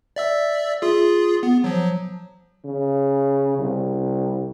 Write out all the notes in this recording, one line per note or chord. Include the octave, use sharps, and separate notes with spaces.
D5 E5 E6
F4 G#4
B3
F3 F#3
C#3
C2